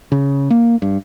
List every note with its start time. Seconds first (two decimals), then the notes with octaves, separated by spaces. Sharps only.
0.12 C#3
0.50 A#3
0.82 G2